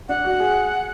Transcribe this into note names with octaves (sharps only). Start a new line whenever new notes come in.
D4 F#5
F#4
G#4